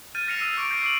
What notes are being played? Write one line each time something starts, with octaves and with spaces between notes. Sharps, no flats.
F6 G6 A6 D#7
F6 A#6 C7 C#7 E7 F7
D#6 E6 D#7
C#6 D6 D7
G6 A#6 C7
D6 D7 F#7